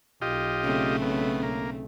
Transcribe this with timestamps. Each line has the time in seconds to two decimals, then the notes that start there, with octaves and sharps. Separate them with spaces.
0.22 B1 F4 G4 D#5
0.63 C#3 A3 C4
1.02 B2
1.43 A#3